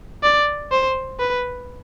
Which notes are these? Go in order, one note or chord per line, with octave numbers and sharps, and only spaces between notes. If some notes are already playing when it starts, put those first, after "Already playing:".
D5
C5
B4